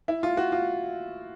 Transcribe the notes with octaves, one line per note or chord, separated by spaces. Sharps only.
E4
F4
F#4
F4